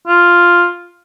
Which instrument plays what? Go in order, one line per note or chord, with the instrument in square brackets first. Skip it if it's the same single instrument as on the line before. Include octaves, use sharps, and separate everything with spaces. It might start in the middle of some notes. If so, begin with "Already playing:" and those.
[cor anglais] F4